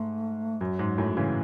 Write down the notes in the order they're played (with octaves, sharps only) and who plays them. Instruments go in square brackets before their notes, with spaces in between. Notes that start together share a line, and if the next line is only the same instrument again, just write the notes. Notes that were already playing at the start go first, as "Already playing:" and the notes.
Already playing: [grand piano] G#2 [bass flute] A3
[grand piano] F#2 [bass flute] F#3
[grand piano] G#2
F#2 A2
C#3 E3